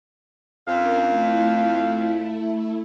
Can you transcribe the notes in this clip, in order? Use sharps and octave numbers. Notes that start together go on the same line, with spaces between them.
F2 C#4 D4 A#4 F5
A3 E4